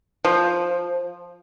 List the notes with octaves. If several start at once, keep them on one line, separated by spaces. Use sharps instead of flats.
F3